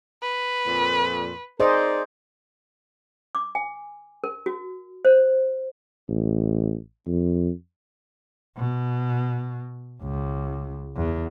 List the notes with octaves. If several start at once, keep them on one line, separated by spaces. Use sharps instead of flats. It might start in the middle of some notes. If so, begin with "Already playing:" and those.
B4
F2 A#2
D#4 G#4 A#4 C5 D5 D#5
D6
G#5
A#4
F#4
C5
A1
F2
B2
C#2
E2